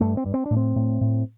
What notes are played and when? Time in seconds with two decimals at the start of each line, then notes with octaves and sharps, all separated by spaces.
0.01 G2 A3
0.17 C4
0.26 G2
0.34 C4
0.46 D4
0.51 A2
0.57 C4
0.76 A2
1.01 A2